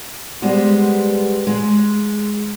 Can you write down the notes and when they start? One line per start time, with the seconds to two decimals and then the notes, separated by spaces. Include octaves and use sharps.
0.42 G3 G#3 B3 C5
1.47 G#3